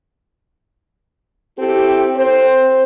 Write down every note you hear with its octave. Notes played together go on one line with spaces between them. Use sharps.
C4 E4 G4 A4
C4 A4 C5